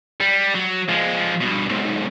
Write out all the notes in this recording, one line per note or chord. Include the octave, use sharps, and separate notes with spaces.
G3
F#3
F3 G#3
G2 B2
B1 G#2